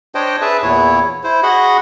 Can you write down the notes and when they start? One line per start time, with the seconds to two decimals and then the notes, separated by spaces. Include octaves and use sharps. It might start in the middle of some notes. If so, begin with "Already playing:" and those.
0.15 D4 C5 C#5 D#5 G5
0.41 G#4 B4 E5 A5
0.63 E2 A#2 E4 C#5
1.24 E4 C5
1.43 F#4 G#4 D#5 F#5 B5